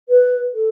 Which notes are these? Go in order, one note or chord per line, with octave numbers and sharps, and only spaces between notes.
B4
A4